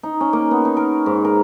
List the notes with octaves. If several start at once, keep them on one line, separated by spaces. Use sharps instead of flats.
D#4
C#4
A#3
B3
D#4
A#4
G#2
A#4